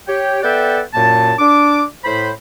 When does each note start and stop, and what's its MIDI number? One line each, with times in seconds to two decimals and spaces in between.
0.07 0.42 67
0.07 0.42 73
0.07 0.42 79
0.43 0.80 59
0.43 0.80 69
0.43 0.80 74
0.43 0.80 76
0.43 0.80 78
0.43 0.80 79
0.94 1.32 42
0.94 1.32 46
0.94 1.32 58
0.94 1.32 81
1.38 1.83 62
1.38 1.83 86
2.04 2.30 45
2.04 2.30 72
2.04 2.30 83